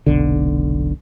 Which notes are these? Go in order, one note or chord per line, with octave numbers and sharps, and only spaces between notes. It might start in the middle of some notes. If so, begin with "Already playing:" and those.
F1 B1 D3